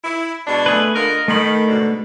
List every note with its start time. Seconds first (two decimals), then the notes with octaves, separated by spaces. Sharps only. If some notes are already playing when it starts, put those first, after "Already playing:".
0.04 E4
0.46 B2 G#3 D4
0.66 A3 G#4 B4
0.95 D3 F4 A#4 D#5
1.28 D#3 A3 B5
1.66 G#2 B2 D3